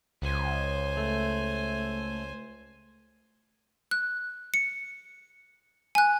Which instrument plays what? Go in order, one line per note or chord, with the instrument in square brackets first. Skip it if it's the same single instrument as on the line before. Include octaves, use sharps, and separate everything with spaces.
[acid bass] C#2 [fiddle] C5 G#5
[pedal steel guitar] A3
[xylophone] F#6
C#7
G#5 F#6